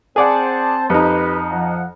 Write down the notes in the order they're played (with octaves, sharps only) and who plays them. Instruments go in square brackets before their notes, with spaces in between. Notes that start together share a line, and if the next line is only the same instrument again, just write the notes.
[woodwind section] C4 C5 A5 [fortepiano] G#4 D5 F#5
[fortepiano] F2 D#4 [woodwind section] G4 B4
[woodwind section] F3 F#5